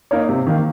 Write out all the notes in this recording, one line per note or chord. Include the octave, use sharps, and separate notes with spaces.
A#3 D#4 A#4 C#5
C3
D#3 A#3